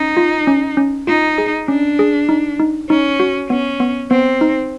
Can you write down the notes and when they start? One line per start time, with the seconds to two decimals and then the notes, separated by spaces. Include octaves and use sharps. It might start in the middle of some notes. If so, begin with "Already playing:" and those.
Already playing: C#4 D#4
0.17 F4
0.47 C#4
0.77 C#4
1.07 D#4 F4
1.38 G#4
1.68 C#4 D4
1.99 G#4
2.29 D#4
2.59 D#4
2.89 C#4 D#4
3.20 F#4
3.50 B3 C#4
3.80 B3
4.10 B3 C4
4.41 D#4